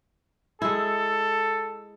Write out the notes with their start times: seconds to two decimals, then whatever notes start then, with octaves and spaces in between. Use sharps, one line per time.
0.62 G#3 E4 A4